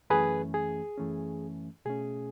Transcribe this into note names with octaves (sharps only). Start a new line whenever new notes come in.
F#2 E3 A3 C#4 G#4 B4
G#4
F#2 E3 A3 C#4
B2 A3 C#4 G#4